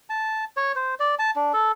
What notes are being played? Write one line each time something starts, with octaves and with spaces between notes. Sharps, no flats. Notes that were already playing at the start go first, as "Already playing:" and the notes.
A5
C#5
C5
D5
A5
D4
A4